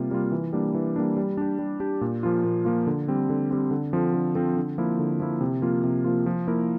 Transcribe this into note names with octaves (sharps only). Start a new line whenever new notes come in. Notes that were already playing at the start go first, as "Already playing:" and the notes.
Already playing: C3 G3 A#3 F4
G3 A#3 F4
E3
G3 A#3 D4
E3
G3 A#3 D4
G3
D4 G4
G3
D4 G4
A#2
F3 A#3 F4
A#2
F3 A#3 F4
D3
G3 C4
D3
G3 C4
D3
F3 C4 F4 A4
D3
F3 C4 F4 A4
D3
F3 A#3 E4
D3
F3 A#3 E4
C3
F3 A#3 F4
C3
F3 A#3 F4
F3
A#3 E4 A#4